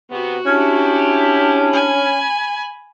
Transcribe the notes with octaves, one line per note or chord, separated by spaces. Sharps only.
C3 B3 F#4
C#4 D4 E4 G4
G#5 B5